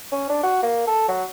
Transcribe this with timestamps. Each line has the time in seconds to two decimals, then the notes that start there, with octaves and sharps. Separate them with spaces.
0.12 C#4
0.29 D4
0.43 F#4
0.63 A#3
0.87 A4
1.08 F#3